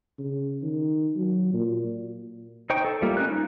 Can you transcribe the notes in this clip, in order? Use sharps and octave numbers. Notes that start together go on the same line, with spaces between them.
C#3
D#3
F#3
A#2
D#4 C5 G5 C#6
A4
G3 A3 A#3 F4
C#4 D#4 F#6
D#4